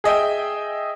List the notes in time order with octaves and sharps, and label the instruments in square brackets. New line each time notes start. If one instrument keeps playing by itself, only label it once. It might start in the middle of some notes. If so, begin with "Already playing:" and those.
[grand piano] G#4 D#5 E5 G5